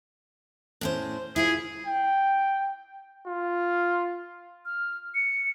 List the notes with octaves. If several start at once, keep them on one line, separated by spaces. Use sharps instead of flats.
A2 C#4 C5
E4 F4 G#4 C5
G5
F4
F6
C#7